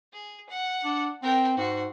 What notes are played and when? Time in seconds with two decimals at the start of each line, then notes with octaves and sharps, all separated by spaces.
0.13 G#4
0.49 F#5
0.84 D4
1.23 C4 A#4 G5
1.57 G#2 F#4 C6